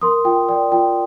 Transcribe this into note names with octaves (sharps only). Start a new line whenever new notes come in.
A#4 C6 D#6
F4 G5
D5 G5
F4 G5